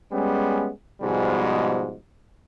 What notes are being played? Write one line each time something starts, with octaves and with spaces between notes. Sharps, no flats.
G3 G#3 B3 C#4
G#2 B2 F3 G3 G#3